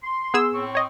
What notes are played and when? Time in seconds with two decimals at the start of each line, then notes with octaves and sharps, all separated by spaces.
0.03 C6
0.34 B3 G#4 E6
0.54 A2 C4 C#6
0.75 C#5 D#5